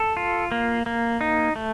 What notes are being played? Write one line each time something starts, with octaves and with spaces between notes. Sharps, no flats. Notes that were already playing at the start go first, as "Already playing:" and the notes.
Already playing: A4
F4
A#3
A#3
D#4
A3